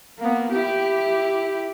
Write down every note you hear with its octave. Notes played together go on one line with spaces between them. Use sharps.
A#3 B3
E4 G4